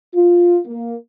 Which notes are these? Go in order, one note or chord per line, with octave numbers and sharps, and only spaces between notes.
F4
A#3